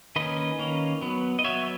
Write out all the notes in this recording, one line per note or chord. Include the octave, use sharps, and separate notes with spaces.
D#3 A#3 C#4 B4 D#5
D#3 A#3 C#4
F#3 B3
D#5
F#3 B3 C#5 E5